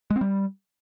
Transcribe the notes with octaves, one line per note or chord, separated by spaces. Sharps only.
G#3
C4
G3